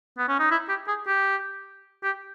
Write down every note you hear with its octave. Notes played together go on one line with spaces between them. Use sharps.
B3
C#4
D#4
E4
G4
G#4
G4
G4